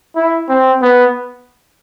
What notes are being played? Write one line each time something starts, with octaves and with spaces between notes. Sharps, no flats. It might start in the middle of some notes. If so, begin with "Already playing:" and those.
E4
C4
B3